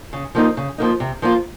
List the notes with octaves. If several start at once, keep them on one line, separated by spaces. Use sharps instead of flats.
C#3
F3 A#3 D#4
C#3
F3 A#3 D#4
C3
F3 A#3 F4